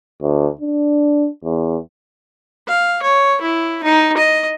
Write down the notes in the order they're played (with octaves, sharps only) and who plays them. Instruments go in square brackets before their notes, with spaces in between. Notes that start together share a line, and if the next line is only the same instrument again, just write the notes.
[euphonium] D2
D4
E2
[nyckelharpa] F5
C#5
E4
D#4
D#5